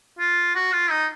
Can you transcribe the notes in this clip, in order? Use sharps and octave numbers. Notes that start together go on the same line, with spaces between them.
F4
F#4
F4
D#4